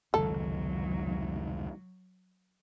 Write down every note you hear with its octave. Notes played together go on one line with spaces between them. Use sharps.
F1 C#2 G#2 D#3 F#3 B3 A4